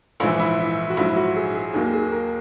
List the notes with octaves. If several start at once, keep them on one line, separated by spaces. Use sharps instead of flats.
A#1 G#2 E3 E4
E4
E4
F#4
A#1 G#2 F#3 E4
E4
F#4
G#4
G#4
D#2 D#3 F#3 A#3 G#4
G#4
A#4